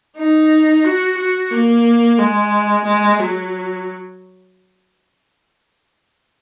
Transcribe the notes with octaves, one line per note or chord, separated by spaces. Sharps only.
D#4
F#4
F#4
A#3
G#3
G#3
F#3